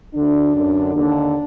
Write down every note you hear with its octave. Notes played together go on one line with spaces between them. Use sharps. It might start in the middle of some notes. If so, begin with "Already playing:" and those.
D2 D3 D4
F#2 D3
D#2 D3 D4